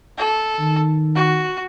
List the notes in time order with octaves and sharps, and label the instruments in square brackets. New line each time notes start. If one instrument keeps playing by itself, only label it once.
[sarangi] A4
[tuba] D#3
[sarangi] F#4